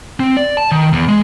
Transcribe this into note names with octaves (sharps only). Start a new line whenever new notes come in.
C4
D5
A5
D#3
E2
G#3